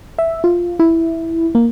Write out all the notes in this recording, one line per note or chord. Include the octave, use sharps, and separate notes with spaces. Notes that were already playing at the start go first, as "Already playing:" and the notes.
E5
F4
E4
A#3